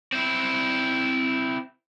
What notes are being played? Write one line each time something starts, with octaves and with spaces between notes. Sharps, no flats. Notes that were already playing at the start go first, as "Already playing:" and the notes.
C4 E4